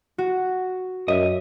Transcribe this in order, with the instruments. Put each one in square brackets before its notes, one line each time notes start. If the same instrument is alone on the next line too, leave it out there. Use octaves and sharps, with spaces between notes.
[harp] F#4
[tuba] F#2 [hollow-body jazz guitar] D#5 E5